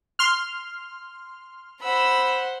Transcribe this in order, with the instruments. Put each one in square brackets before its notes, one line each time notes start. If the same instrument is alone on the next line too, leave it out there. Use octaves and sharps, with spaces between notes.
[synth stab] C6 F6
[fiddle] C5 F#5 [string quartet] B5 E6